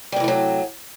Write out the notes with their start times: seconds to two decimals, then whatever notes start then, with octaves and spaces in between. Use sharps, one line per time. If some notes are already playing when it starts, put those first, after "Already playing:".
0.12 G3
0.16 C3
0.20 E3
0.24 A3
0.28 F#3